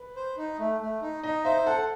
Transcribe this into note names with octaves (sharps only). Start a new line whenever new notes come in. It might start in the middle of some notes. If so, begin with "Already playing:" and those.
Already playing: B4
C5
D#4
A3
A3
D#4
D#4 D#5
C5 E5
A4 F#5